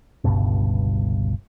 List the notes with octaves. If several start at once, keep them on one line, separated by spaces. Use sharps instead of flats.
G1 C#2 G2 B2